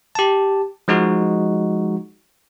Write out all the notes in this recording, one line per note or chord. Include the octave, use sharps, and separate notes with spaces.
G4 A5
F3 G#3 D#4 F#4